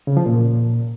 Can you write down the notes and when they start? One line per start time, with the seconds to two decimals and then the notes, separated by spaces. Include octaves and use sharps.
0.07 C#3
0.17 F3
0.26 A#2